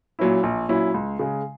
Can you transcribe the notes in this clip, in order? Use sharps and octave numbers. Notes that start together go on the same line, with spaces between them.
A#2 F#3 C#4 E4
A#1
A#2 F#3 C#4 E4
C#2
C#3 G#3